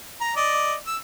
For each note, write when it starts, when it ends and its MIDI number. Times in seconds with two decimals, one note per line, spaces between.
0.21 0.33 82
0.36 0.75 74
0.36 0.75 75
0.87 0.97 88